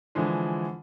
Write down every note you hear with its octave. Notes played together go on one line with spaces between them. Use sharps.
D3 E3 F3 G#3